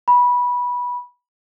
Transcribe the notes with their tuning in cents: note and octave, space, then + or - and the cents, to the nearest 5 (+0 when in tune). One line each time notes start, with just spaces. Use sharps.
B5 -15